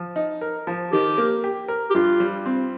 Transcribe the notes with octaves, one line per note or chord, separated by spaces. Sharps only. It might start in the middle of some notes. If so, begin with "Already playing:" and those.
Already playing: F3
D#4
A#4
F3
D#3 G4
A#3
G4
A#4
G4
G2 F4
G3
C4